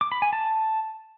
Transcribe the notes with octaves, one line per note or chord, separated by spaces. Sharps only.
D6
B5
G#5
A5